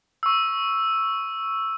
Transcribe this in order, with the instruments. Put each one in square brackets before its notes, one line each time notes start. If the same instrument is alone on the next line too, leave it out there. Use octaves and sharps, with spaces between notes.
[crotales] C#6 E6